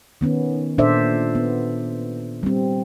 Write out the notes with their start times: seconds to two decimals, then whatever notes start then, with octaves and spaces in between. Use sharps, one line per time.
0.21 D#3 B3 C#4
0.78 A#2 D4 A4 C5 D5 E5
1.35 B3
2.43 G3 C4